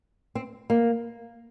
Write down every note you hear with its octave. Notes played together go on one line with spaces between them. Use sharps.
C4
A#3